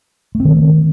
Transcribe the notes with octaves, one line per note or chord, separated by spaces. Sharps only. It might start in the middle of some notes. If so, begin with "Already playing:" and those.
A3
C4
D#3